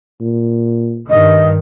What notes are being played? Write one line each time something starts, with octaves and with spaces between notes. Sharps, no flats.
A#2
G2 D#3 D#5